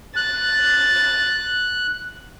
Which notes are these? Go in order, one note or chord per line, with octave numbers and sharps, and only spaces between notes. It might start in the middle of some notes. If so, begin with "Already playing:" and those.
F#6 A6